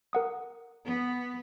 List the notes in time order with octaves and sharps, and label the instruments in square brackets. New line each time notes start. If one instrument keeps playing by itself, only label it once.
[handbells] A#4 F#5 D#6
[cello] B3